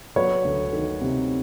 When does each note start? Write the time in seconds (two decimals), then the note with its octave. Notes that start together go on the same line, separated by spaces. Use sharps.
0.16 F#3 B4 C#5
0.45 D2
0.73 D#3
1.01 C3